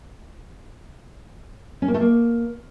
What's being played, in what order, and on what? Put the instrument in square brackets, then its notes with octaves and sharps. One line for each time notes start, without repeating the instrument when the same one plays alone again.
[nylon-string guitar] C#4
A#3
A3
A#3